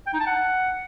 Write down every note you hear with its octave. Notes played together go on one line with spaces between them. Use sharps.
G5
D#4
A5
F#5